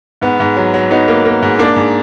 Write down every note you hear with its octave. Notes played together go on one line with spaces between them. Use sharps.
G#2 B3
G#2
F#3
F#3
F#3 B3 D#4
A#3
A#3
G#2
A#3 D4
G#2